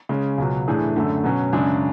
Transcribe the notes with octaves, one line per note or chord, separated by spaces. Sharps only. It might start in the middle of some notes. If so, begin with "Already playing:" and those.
C#3 G#3 C#4
C#2 B2 F#3
A2 E3 A3 D4 G#4
F#2 D3 A3
B2 F#3 C#4
F#2 C#3 G#3 D4 G#4